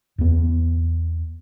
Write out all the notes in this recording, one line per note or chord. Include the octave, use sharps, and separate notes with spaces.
E2 B3